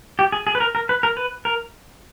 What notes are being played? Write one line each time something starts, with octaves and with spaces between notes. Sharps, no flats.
G4
G#4
G#4
B4
A#4
A#4
B4
A#4
B4
A#4